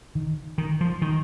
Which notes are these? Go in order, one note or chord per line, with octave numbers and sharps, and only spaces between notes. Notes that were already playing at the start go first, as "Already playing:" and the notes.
D#3
D#3
F3
D#3